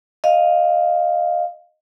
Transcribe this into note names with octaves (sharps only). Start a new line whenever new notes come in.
D#5 F5